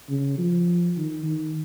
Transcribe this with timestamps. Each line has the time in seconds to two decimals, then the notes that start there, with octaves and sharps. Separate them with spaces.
0.09 C#3
0.38 F3
0.97 D#3
1.26 D#3